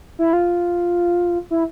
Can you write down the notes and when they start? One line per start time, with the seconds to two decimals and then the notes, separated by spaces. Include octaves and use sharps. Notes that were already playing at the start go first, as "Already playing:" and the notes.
0.19 E4
0.33 F4
1.51 E4